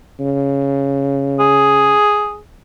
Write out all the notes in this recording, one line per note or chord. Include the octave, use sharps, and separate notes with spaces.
C#3
G#4